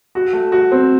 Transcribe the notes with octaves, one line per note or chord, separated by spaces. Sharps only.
F#4
A3
F#4
C4